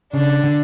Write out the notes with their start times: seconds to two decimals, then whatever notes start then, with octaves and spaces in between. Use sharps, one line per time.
0.13 C#3 D4
0.44 D3